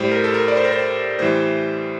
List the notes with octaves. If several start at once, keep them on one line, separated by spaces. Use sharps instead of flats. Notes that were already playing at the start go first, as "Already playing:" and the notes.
Already playing: A2 G3 C5
A#4
A4
A#4
D5
C5
A#4
C5
A2 E3 G3 C5